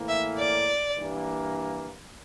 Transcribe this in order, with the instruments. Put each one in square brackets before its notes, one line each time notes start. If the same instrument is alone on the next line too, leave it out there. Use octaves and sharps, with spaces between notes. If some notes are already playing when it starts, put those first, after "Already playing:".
Already playing: [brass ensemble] A2 E3 A#3
[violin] E5
D5
[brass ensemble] G2 E3 A#3